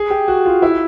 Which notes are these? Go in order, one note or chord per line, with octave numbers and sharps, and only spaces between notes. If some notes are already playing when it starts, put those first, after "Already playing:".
Already playing: G#4
G4
F#4
F4
E4